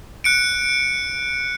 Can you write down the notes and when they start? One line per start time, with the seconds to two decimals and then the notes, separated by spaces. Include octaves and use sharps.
0.24 F#6 C#7 D7